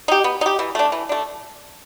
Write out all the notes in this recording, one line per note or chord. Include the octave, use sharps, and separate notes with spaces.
D#4 G4
B3
D#4 G4
E3
A3 D4
E3
A3 D4